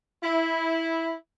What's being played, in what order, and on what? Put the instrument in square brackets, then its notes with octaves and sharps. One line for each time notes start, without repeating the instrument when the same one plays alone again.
[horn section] E4